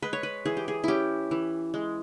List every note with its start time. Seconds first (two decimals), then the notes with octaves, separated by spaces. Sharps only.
0.02 G#3 B4
0.13 C#5
0.23 B4
0.45 E3 G#4
0.57 G4
0.68 G#4
0.84 C#4 E4 G4
1.31 E3
1.74 G#3